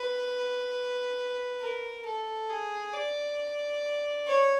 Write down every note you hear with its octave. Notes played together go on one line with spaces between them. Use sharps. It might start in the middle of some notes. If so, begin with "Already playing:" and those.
Already playing: B4
A#4
A4
G#4
D5
C#5